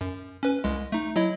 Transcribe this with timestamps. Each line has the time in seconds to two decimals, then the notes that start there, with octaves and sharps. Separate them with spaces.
0.01 F#2
0.43 C#4 B4
0.64 C2 G#3
0.92 A3 D#4
1.16 F#3 E4 D#5